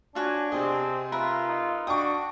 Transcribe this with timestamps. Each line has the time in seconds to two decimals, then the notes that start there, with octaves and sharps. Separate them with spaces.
0.15 D4 F4 F#4 C#5 G#5
0.52 C3 C4 G#4 D#5
1.12 F4 A#4 B4 E5 B5
1.49 D#4
1.87 D4 F#4 G5 C#6 D#6